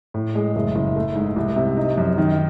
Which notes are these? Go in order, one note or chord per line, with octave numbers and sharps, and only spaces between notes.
A2
G#3
F#1
F#1
A3
G#2
C2
C3
D#4
F#2
D#3